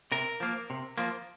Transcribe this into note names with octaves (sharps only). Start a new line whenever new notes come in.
C3 A#4
F3 A#3
C3
F3 A#3